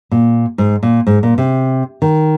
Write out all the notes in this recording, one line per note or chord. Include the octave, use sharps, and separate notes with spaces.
A#2
G#2
A#2
G#2
A#2
C3
D#3